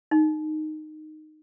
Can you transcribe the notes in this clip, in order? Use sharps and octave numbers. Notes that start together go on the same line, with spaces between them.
D#4